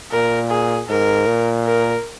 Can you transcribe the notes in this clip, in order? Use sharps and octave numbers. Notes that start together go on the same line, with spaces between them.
A#2 A#4
G#4
G#2 A#4
A#2
A#4